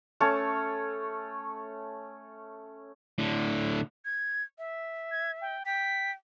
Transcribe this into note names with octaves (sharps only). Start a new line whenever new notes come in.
A3 C#4 C#5 A5
A2 D3
G#6
E5
G#6
G5
G5 B6